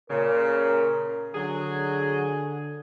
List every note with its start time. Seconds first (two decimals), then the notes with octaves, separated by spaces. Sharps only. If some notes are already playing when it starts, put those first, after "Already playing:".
0.10 A#2 C#3 A#4
1.35 D3 F#3 G#4